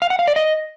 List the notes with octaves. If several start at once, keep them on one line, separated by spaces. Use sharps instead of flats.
F5
F#5
F5
D5
D#5